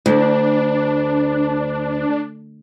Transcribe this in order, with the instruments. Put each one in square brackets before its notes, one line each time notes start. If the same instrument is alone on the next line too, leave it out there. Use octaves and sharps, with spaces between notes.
[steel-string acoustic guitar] D2 [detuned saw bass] D4